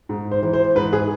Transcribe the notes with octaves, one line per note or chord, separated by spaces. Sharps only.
G#2
C5
E3
C5
G#2 B4
G#4